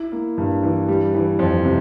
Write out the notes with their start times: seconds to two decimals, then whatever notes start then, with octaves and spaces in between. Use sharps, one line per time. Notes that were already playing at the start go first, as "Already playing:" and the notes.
Already playing: E4
0.12 A#3
0.38 G2
0.63 E3
0.88 G3
1.14 E3
1.39 F2
1.65 C3